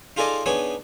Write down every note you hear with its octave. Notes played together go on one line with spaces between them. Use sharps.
D#4 F4 G#4 A4 D5 D#5
B3 D4 D#4 G#4 C#5